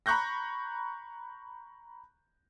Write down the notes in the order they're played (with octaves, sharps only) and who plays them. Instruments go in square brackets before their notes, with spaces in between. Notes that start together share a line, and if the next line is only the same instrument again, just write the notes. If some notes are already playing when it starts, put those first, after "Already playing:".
[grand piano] A#5 B5 C#6 F#6 G6 A#6